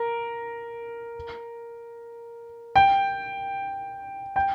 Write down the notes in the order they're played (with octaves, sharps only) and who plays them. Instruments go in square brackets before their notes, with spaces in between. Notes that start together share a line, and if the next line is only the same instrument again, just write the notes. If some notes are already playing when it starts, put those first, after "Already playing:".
Already playing: [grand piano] A#4
G5
G5